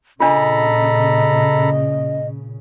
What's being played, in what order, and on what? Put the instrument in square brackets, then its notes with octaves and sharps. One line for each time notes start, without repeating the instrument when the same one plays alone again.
[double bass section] A#2 C#3 [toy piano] D4 F4 [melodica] A4 A#5 B5 [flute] D#5